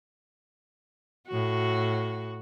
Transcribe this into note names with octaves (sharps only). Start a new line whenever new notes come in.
A2 F#4